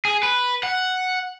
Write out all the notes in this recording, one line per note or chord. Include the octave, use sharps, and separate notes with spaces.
G#4
B4
F#5